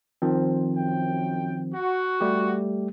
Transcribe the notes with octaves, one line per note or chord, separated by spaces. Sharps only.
D#3 F3 C4
F#2 G5
F#4
G3 A3 G4